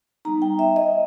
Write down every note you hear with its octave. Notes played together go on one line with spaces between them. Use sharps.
G3 B3 D#4 A#5
G5
E5
D#5